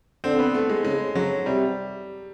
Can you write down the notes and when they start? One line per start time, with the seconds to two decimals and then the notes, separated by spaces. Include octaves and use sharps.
0.24 D3 C4
0.39 B3
0.54 A3
0.70 G#3
0.85 C#3 G#3
1.15 C#3 F#3
1.46 C3 G3